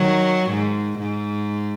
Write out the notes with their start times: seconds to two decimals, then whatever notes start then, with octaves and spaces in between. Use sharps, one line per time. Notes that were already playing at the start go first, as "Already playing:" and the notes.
Already playing: D#3 F#3
0.50 G#2
0.99 G#2